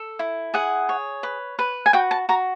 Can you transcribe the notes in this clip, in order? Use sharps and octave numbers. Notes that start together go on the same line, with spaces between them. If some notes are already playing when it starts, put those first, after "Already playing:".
Already playing: A4
E4
G#4 F#5
C#5
B4
B4
G#5
F#4 G5
A5
F#4 A#5